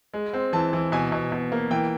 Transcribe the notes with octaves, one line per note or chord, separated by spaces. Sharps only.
G#3
C4
E3 A5
E3
B2 G#5
B2
B2
A#3
E3 G5